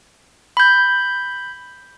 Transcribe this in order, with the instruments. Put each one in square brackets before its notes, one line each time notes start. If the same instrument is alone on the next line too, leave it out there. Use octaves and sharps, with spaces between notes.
[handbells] B5 G6